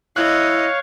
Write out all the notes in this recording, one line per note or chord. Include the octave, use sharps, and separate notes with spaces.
E4 C#5 D#5 F5 C#6 F#6